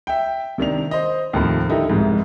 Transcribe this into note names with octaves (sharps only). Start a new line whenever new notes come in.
E5 G5
C3 D#3 D4 F7
C5 D#5
D#2 A2 C3 F3
D3 D#4 E4 G4 A4 A#4
F1 C2 G#2